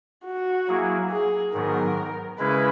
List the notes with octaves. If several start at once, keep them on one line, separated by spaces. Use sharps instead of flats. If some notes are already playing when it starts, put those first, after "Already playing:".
F#4
F#3 A#3 E4 G#4
G#4
G#2 D#3 F#3 B3 A#4
C#3 G#3 C#4 E4 G#4 B4